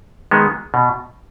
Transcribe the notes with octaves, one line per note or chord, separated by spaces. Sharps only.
D#3 G#3 B3
B2